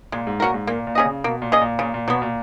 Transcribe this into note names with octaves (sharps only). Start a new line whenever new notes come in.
A#2 G#3
G#2
A#2 C#4 F#4 A#4
G#2
A#2 A#3
A#2
C#4 G#4 D#5
C#3
B2 A#3
A#2
C#4 G#4 D#5
A#2
A#2 C#3
A#2
B2 F#3 B3
A#2